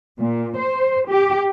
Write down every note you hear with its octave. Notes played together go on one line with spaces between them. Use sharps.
A#2
C5
G4